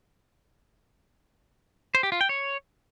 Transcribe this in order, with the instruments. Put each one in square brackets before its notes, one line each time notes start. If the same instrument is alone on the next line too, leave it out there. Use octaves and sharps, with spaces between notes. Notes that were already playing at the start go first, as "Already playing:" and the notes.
[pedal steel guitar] C5
G4
F4
G5
C#5